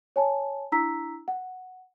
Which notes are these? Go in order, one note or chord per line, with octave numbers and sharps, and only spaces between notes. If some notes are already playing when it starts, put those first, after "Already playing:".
C#5 G#5 A5
D4 E4 A#5 E6 B6
F#5